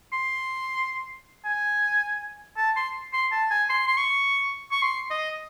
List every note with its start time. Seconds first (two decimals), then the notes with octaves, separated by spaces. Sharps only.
0.13 C6
1.45 G#5
2.57 A5
2.76 C6
3.13 C6
3.32 A5
3.51 G#5
3.70 C6
3.87 C6
3.98 C#6
4.72 C#6
4.82 C6
5.11 D#5